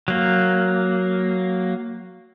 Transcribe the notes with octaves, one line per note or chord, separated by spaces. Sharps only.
F#3 A#3